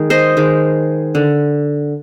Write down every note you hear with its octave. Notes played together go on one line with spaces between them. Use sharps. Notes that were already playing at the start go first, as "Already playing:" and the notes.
Already playing: D#3 G#3
C5 D#5
D#3 G#3
D3